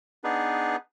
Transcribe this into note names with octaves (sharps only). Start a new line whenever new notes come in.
B3 D4 D#4 G#4 B4